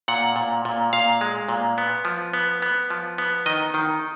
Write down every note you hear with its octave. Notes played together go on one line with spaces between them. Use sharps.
A#2 F#5
A#2
A#2
A#2 F5
G#3
A#2
B3
F3
B3
B3
F3
B3
D#3 D#5
D#3